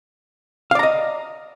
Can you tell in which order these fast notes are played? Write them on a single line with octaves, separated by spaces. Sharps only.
F5 D5 A#5 D#5